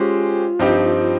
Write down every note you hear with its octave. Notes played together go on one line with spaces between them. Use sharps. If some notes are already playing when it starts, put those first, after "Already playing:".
Already playing: G#3 C#4 F4 G4 C5
G2 F3 C4 D#4 G4